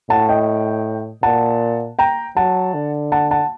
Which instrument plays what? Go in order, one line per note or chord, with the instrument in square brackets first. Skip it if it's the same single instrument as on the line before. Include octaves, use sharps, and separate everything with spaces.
[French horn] A2 [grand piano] F#5 A5
[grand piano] D#5 G5
[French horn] A#2 [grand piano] F#5 A5
[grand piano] G5 A#5
[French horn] F#3 [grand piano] F#5 A5
[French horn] D3
[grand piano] F#5 A5
F#5 A5